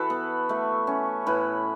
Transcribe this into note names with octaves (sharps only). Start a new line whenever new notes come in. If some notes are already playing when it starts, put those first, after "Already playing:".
Already playing: E3 F#4 A4 B4
B3
A3
C#4
A2 B4